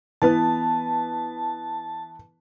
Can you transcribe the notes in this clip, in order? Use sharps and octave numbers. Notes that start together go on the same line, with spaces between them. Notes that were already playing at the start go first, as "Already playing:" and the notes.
E3 B3 B4 A5